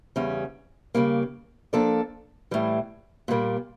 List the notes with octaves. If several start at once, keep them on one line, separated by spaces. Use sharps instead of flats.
E2 C#3 G3 C#4
C#3 G3 A#3
F3 A#3 D4 A4 D5
A2 E3 G3
A#2 G3 A#3